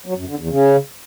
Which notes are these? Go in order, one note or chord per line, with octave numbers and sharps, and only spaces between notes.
F#3
F#2
D3
E2
C#3